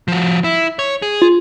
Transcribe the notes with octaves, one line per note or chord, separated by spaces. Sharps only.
F3 F#4
E4
C#5
G#4
F4